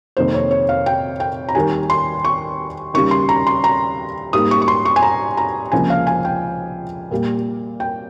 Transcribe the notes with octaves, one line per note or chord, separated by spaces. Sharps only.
F2 C3 D#3 A#3 C5
C#5
C#5
F5
G5
G5
A#5
D#2 D#3 G3 G#5
C6
C#6
D#2 C#3 G3 C#6
C6
A#5
C6
A#5
G#2 G3 A#3 D#6
C#6
C#6
C6
C#6
G#5
A#5
A#5
C#2 C3 F3 A#3 G#5
F5
G#5
G5
A#2 G3 A#3
G5